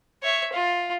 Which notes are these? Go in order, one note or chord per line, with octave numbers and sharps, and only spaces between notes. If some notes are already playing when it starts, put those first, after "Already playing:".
C#5 E5
F4